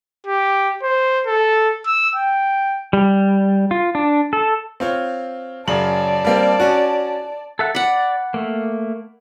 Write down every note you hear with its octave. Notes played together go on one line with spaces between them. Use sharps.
G4
C5
A4
E6
G5
G3
F4
D4
A4
C4 F4 C#5
F#2 C#3 D5 A5 F#7
G3 A#3 C4
C#4 F#4
A4 E5 F#5
D5 F#5 B5
A3 A#3